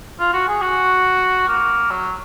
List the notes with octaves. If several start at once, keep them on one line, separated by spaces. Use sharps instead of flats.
F4
F#4
G#4
F#4
A#3
F#3